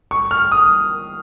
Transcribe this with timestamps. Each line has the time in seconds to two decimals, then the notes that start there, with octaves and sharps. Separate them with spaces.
0.11 C#6
0.31 F6
0.52 D#6